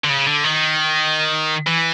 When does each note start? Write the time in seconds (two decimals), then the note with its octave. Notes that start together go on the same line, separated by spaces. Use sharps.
0.04 D3
0.09 C#3
0.27 D3
0.44 D#3
1.67 E3